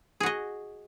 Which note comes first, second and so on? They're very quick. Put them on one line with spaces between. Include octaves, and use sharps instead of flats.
G#4 F#4 D#5